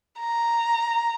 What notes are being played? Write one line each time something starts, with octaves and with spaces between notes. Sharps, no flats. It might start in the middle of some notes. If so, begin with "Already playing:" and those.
A#5